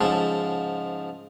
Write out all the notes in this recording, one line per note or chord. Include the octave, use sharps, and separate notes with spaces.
G#2 C#3 F3 A4